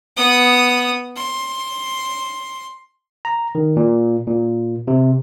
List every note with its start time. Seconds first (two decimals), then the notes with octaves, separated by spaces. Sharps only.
0.16 B3 D#6
1.16 C6
3.25 A#5
3.55 D#3
3.77 A#2
4.27 A#2
4.88 C3